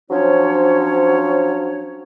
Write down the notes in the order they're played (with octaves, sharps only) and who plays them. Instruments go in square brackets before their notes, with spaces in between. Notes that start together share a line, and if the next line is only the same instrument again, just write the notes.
[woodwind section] F3 F#3 C#4 D4 C5 C#5